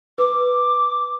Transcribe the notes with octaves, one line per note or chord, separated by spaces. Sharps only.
B4 D6